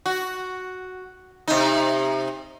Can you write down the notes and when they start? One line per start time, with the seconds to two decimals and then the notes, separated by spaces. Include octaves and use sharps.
0.06 F#4
1.48 C3 D#4